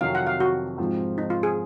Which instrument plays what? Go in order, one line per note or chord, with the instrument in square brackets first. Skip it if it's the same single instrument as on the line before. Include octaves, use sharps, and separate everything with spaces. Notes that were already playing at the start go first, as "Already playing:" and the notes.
[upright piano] F2 C3 D#3 F#3 [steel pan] F5
[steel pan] F#5
F5
F#4
[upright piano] G#2 F3 C4
[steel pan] D#4
F4
G#4